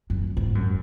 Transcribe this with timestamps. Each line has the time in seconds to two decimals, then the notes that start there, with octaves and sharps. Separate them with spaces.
0.10 F#2
0.37 G#2
0.55 F#2